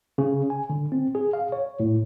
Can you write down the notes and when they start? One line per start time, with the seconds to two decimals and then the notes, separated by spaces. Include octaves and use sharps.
0.18 C#3
0.50 G#5
0.70 D3
0.92 C4
1.15 G#4
1.33 F5
1.52 C#5
1.80 A2